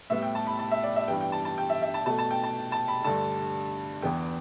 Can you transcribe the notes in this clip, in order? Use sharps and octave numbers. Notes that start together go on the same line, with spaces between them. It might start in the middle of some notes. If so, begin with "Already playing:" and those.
A2 G3 B3 E5
G5
A5
B5
A5
E5
D5
E5
G2 E3 G3 B3 G5
G5
A5
A5
G5
E5
E5
A5
B2 A3 A5
A5
G5
A5
A5
B5
G2 D3 A3 A5
E2 E3 B3 G5